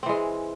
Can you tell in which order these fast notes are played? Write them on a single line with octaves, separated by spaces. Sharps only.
C4 E3 G#3